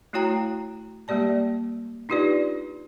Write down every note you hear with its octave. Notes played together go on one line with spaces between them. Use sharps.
A3 E4 F#4 C#5 G5 A#5
G3 G#3 A#3 G4 D5 A5
D4 D#4 F4 G4 B4 D5